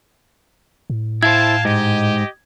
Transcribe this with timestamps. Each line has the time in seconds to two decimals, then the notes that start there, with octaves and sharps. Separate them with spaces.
0.90 A2
1.23 E4 C5 F5 G5 A5 G#6
1.65 G#2 G4 D#5